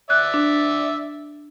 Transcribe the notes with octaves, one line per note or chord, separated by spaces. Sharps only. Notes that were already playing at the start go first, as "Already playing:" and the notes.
D5 E5 F#6
D4